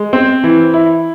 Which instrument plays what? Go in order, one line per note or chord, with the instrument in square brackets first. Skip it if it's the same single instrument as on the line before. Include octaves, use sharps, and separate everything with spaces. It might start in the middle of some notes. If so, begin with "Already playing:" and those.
Already playing: [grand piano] G#3
C4
E3
E4